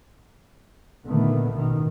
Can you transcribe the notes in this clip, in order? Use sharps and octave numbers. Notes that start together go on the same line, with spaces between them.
A#2 D3 D#3 A3 B3
A1 B2 D#3